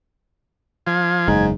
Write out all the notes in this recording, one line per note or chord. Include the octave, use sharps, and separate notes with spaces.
F3 G#6
F#1 E2 G#2